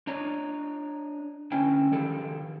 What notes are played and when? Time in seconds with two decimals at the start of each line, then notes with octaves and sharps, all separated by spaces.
0.07 D4 C#5 D#5 A#5
1.52 D3 C#4 E4 B4 G5
1.92 D#3 F3 G4 A4